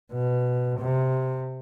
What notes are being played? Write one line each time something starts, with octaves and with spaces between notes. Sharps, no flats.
B2
C3